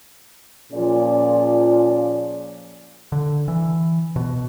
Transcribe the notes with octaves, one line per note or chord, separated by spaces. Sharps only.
A#2 F3 C#4 F4 G#4 D5
D3
E3
B2